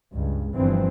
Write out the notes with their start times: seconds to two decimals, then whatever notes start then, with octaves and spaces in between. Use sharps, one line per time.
0.12 C#2 G2
0.54 G1 G2 E3 F3 C4